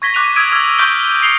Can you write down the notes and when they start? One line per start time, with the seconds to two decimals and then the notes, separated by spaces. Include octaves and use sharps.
0.02 C#6 G#6 A#6 B6 G7
0.14 C#6 D6 F#6 B6 D#7 F7
0.36 D#6 E6 G#6 B6 D7 D#7
0.52 E6 F6 G#6
0.78 C#6 F6 G6 B6 D7 G7
1.22 D#6 C7 C#7 F7 G7